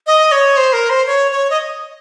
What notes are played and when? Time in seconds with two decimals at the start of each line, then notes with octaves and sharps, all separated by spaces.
0.07 D#5
0.32 C#5
0.57 C5
0.73 A#4
0.90 C5
1.06 C#5
1.31 C#5
1.50 D#5